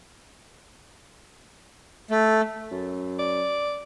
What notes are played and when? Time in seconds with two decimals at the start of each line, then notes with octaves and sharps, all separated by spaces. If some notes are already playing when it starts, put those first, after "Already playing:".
2.11 A3
2.72 F#2
3.19 D5